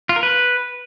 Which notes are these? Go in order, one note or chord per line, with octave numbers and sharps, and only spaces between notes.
F4
A#4
B4